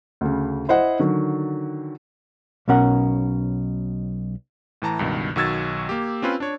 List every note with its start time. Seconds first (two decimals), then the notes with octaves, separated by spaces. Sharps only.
0.21 D2 C#3
0.69 E4 C5 D#5 F#5
0.99 D3 D#3 F#3
2.68 B1 B2 C#4 A#4 F#5
4.82 A2 E3 A5 A#5
4.99 C#2 G2 B2 D#3
5.36 B1 D#3 F#4 E6 G#6 A6
5.89 A#3 G4
6.22 C4 C#4 F4 B4
6.40 D4 C#5